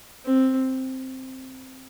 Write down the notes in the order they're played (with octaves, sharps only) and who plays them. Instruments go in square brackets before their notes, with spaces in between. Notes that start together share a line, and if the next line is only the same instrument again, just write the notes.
[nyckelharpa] C4